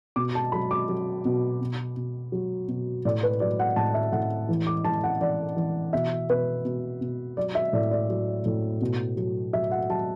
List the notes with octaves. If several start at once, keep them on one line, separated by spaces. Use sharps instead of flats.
B2 D6
A5
F#3 B5
D6
F#3
B2
B2
B2
F#3
B2
A2 D5
B4
F#3 D5
F#5
A2 A5
E5
A2 F#5
E3
D6
E3 A5
F#5
E3 D5
E3
B2 E5
B2 B4
B2
B2
F#3 D5
E5
A2 D5
D5
F#3
A2
B2
F#3
F#3 E5
F#5
F#3 A5